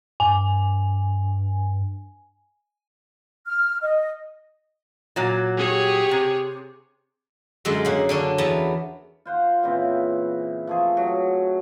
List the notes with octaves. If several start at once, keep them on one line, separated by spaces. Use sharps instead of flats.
G2 G#5
F6
D#5
A#2 F#3
G4 G#4 C#5
C3
F#2 D3 G#3 D5
C#3 A#3 F#5
D3 C#4 D4
E2 B3 A5 A#5
F4 C5 F#5
A#2 C#3 E3 C4
F3 A3 G#4
F#3